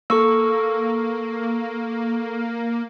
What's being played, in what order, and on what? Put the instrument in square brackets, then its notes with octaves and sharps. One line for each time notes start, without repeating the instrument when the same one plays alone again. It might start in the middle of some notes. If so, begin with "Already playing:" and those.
[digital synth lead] A#3 [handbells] A4 C#6 E6